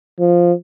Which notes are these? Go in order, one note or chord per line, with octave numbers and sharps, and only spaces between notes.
F3